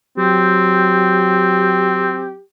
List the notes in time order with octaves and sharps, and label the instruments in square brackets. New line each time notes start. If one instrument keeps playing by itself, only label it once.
[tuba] F#3 [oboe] C4 [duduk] G4